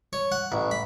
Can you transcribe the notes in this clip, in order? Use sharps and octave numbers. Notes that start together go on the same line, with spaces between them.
C#5
F#5
A1
B5